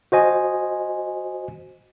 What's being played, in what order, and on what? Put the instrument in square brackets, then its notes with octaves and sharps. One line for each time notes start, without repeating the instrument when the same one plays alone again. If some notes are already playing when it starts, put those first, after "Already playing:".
[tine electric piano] F#4 C5 D#5 G#5